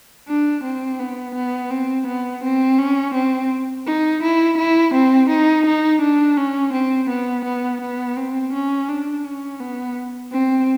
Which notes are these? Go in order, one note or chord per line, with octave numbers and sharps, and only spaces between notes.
D4
C4
B3
B3
C4
B3
C4
C#4
C4
D#4
E4
E4
C4
D#4
D#4
D4
C#4
C4
B3
B3
B3
C4
C#4
D4
C#4
B3
C4